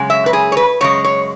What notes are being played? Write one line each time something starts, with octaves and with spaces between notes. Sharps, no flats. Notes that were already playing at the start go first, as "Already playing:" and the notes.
Already playing: F#2 C#3 G#3
E5
B4
G#4
C#5
B4
F#2 C#3 G#3 C#5
C#5